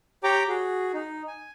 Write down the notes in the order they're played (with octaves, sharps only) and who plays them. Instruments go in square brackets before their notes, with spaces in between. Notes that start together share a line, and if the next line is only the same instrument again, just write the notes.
[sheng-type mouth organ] G4 C#5 G5 A#5 D6
F#4 G#4
D#4
G#5